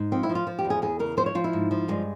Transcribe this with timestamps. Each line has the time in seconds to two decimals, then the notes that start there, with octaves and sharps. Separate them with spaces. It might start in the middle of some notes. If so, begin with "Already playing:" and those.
Already playing: G#2
0.12 F3 C4
0.23 E4
0.29 F3
0.35 F4
0.47 F3
0.59 G4
0.65 E2
0.70 G#4
0.82 E2 G#4
0.99 C#3 A#4
1.17 F3 C5
1.26 C#5
1.35 F3 F4
1.44 E4
1.53 G#2
1.71 F3
1.88 G2 G#3